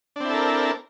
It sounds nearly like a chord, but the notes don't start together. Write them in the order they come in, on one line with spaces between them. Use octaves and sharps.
D4 C4 E4 A4 A#4